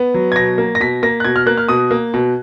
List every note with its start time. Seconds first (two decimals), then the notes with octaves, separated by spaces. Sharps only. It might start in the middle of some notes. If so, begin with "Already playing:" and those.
Already playing: B3
0.14 F#3
0.32 G#6
0.36 B2 A#6
0.58 A#3
0.75 A#6
0.80 B2 B6
1.03 A#3 A#6
1.20 F#6
1.25 B2 G#6
1.36 F6
1.46 A#3 F#6
1.58 F6
1.68 B2 D#6
1.91 A#3
2.14 B2